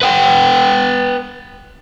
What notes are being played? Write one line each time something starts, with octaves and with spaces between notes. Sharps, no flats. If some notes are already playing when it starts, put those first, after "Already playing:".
B4 F#5 G5